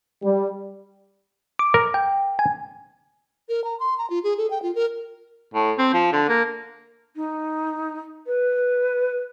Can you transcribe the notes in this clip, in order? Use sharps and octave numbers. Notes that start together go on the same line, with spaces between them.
G3
D6
A#4
G5
G#5
A#4
A#5
C6
A#5
F4
G#4
A4
G5
F4
A#4
A2
C4
F3
D3
A#3
D#4
B4